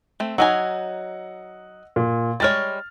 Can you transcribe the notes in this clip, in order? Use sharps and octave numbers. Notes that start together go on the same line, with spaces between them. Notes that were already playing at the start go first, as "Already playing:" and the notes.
A3 C4
F#3 D#4 D#5 F#5 G#5 E6
A#2
G3 G#3 C#5 F6 A6